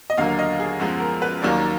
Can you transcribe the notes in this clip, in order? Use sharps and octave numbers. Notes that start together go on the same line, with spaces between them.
D#5
D#2 D3 F#3 A#3 F5
D#5
G#4
F#2 F3 G#3 B3
A#4
B4
D#2 D#3 F#3 A#3 D5